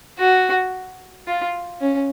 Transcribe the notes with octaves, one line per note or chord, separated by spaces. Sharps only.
F#4
F4
C#4